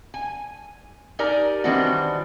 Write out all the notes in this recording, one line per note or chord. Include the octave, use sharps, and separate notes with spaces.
G#5
D#4 G4 A#4 D5 G#5
D#3 E3 G3 C4 D4 F#4